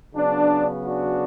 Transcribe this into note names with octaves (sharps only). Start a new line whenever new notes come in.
C#3 F#3 B3 D4
D4 F#4